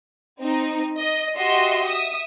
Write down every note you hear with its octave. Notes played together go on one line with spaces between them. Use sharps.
C4 D#4
D#5
F#4 G4 D#5 E5 C6
E5 D#6